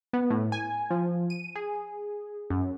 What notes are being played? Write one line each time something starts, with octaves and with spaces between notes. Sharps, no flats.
B3
A2
G#5
F3
D#7
G#4
F#2